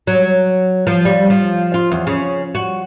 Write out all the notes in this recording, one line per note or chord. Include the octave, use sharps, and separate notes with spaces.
F#3
F3
G3
F3
F4
E2
C#3
F#4